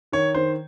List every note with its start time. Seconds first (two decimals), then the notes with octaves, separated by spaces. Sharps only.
0.12 D#3 C#5
0.34 D#3 C5